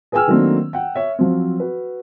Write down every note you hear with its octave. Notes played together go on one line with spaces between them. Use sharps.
G#4 B4 G5 G#5 E6 F6
D#3 F#3 A3 A#3 C4 D4
F#5 G5
C#5 E5
F3 F#3 C4
F#4 B4